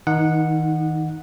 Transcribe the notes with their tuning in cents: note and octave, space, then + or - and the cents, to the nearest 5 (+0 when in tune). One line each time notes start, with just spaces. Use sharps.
D#3 +35 D#4 +0 F#5 -10